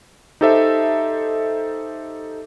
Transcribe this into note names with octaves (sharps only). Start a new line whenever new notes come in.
D#4 G4 A4 C5 E5